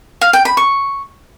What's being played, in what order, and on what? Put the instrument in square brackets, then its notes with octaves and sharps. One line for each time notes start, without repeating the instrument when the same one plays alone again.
[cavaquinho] F5
G5
B5
C#6